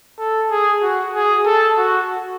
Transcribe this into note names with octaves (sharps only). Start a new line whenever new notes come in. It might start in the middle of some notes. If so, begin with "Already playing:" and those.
A4
G#4
F#4
G#4
A4
F#4